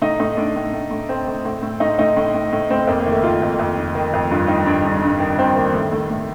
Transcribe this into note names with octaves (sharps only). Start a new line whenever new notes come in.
A2 D#4
A2 D#4
A2 D4
A2
A2
A2
A2 C4
A2
A2
A2
A2 D#4
A2 D#4
A2
A2
A2
A2 C4
F2 A#3
A#3
D#3
A3
D#3 F4
F2
F2
D#3
D#3
F2
G2 F4
D#3 D#4
G2 D4
G2
G2
D#3
D#3 C4
D#3 A#3
A2 A3
A2
A2